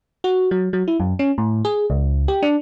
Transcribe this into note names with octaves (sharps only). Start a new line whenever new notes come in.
F#4
F#3
F#3
E4
F#2
C#4
A2
G#4
C#2
G4
D4